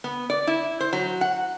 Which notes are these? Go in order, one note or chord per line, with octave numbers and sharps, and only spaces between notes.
B3
D5
E4
C5
F#3
F#5